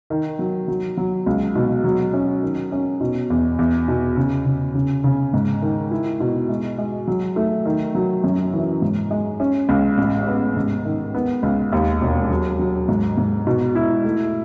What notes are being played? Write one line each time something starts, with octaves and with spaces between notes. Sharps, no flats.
D#3
F#3
F#3
F#3
C#2
B2
F#3
C#4
D#3
C#4
B2
E2
E2
B2
C#3
C#3
C#3
C#3
G#2
D#3
E4
B2
G#3
G#3
F#3
A3
D#3
F#3
F#2
E3
G#2
G#3
C#4
C#2
A1
B3
G#2
D#3
B3
C#2
D#2
E1
F#3
F#3
G#2
G#2
B2
E4
A3